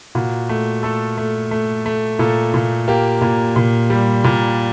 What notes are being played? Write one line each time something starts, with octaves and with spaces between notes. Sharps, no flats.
A#2 F#4
A3
A3 A4
A3
A3
A3
A#2 A4
A#2
A#3 G4
A#2
A#2
G3
A#2